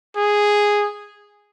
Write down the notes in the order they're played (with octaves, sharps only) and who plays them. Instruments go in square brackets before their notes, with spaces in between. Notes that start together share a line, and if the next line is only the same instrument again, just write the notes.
[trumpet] G#4